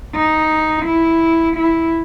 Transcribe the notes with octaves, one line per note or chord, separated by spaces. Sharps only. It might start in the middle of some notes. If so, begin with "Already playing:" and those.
D#4
E4
E4